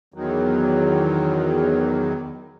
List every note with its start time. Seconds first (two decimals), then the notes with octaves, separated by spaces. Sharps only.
0.14 E2 D#3 F#3